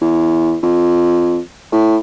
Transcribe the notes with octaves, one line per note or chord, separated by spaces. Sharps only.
E2
F2
A2